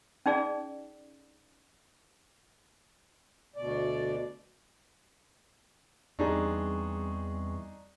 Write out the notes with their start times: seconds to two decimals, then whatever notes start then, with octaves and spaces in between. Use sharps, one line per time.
0.26 C#4 D#4 G#4 D5
3.56 D2 B2 D5
6.19 E2 G3 C4 D4 D#4 G#4 C#6